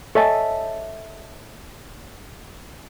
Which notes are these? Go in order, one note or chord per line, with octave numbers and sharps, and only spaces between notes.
A4 C#5 D#5 E5 G#5 A5